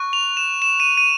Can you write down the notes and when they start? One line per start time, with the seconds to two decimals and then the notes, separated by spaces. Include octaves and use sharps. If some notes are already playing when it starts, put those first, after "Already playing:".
Already playing: C#6 F#6
0.13 F7
0.37 E7
0.62 E7
0.80 D#7
0.98 D#7